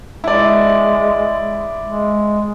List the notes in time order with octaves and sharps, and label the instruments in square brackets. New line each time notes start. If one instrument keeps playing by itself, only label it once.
[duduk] G#3 [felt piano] E4 D5
[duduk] G#3